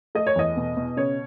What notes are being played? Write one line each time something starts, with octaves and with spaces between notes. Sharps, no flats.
A3 D#5
C#5
E2 D#5
B2
B2
C#3 C#5